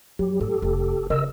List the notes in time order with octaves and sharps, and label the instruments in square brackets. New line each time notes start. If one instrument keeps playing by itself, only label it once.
[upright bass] F#2 [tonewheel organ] F#3 G4
[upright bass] A2 [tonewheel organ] G4 A4
[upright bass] F1
[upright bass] C#3 D4 [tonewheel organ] A#4 D#5 E6